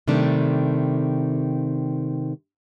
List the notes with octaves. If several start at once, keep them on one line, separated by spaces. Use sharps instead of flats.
C3 D#3 G3 A3 D4